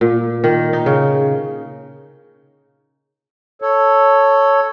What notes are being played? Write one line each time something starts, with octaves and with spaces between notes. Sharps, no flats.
A#2
D#3
D#4
C#3
A4 C#5